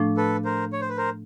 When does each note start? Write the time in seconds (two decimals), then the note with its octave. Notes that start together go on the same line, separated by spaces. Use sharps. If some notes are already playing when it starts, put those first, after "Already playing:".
Already playing: A2 F3 A3 D4
0.17 A4 B4
0.45 A#4 C5
0.73 C#5
0.81 C5
0.89 B4
0.97 A#4 C5